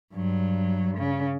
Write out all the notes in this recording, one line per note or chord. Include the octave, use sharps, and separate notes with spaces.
G2 F#3
C#3